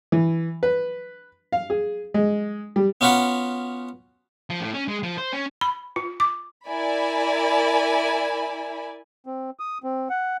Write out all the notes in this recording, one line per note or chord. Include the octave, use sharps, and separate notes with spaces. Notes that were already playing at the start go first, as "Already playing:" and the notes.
E3
B4
F5
G#4
G#3
G3
B3 C#4 F4 F#4 B4 F#5
F3
A2
C#4
G#3
F3
C5
C#4
B5
F4
D6
E4 A#4 D5 G#5 B5
C4
D#6
C4
F#5